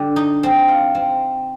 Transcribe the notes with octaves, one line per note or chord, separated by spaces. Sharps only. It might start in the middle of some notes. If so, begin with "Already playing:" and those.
Already playing: D3 G3
D#4
C4
F4
C4